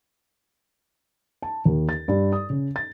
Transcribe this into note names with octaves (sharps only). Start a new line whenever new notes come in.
A5
D#2
A6
G2
D#6
C#3
A6